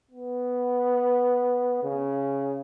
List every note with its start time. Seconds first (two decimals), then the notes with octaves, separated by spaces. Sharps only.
0.11 B3
1.83 C#3